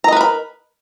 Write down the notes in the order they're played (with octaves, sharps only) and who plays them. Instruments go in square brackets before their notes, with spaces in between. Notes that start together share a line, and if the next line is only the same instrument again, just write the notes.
[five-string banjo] A#5
D#5
B4
A#4
B5